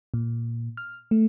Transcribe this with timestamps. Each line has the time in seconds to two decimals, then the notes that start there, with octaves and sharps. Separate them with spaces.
0.14 A#2
0.77 F6
1.11 A3